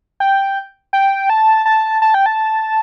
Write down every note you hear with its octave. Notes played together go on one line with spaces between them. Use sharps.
G5
G5
A5
A5
A5
G5
A5